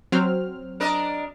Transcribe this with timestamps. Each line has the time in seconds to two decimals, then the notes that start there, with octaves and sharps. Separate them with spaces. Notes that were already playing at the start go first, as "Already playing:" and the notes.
0.12 F#3 C4 F6
0.80 D4 A#4 D#5